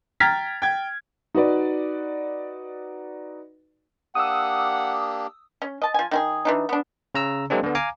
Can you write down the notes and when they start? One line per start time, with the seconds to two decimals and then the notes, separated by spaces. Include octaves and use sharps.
0.20 G5 A#5 F6 G#6 A6 B6
0.62 G5 G#6
1.35 D#4 F#4 B4 D5
4.15 A#3 D4 G4 F#5 D#6 E6
5.62 C#4
5.82 D#5 A5
5.94 F3 G#5
6.11 D#3 E4 G#4
6.45 E3 D4 D#4
6.69 B3 D4
7.15 C#3 A#5 E6
7.50 F#3 G#3 A#3 C4 D4
7.63 D3 B3
7.75 F5 G#5 A#5 D6